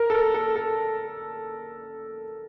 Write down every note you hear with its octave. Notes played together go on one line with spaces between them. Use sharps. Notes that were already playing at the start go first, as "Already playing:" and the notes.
Already playing: A#4
A4
A#4
A4
A4